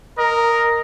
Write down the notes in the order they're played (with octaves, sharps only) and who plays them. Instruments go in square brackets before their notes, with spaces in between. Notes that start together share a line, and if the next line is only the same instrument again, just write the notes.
[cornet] A#4 [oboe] D#5